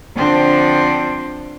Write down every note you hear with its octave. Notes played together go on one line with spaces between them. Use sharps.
D3 F3 C4 D4